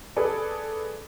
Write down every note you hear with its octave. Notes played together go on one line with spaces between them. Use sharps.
G#4 A4 B4 D5